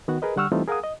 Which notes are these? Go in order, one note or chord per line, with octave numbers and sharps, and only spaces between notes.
D#3 B3 F#4 F#5
G#4 A#4 B4 D#5
D3 G3 F#5 C#6 E6 F6
E3 G3 A3 C4 D#4 F4
G#4 A#4 F5 F#5 G#5 D#6
D#5